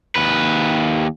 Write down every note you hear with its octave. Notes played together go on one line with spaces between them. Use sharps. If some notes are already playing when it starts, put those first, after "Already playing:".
D#2 B4